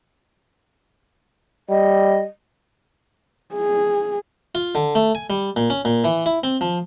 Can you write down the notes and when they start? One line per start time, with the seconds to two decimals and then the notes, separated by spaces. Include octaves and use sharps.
1.69 G3 D#5
3.54 G#4
4.55 F4
4.75 D3
4.95 A3
5.15 G#5
5.30 G3
5.56 A#2
5.70 C#4
5.85 A#2
6.04 E3
6.26 E4
6.44 C4
6.61 F3